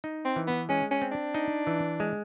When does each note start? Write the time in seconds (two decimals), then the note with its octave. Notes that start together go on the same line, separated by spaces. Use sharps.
0.04 D#4
0.25 C4
0.36 E3
0.48 B3
0.69 G#3 C#4
0.91 C#4
1.02 C4
1.12 D4
1.35 D#4
1.67 E3
2.00 G#3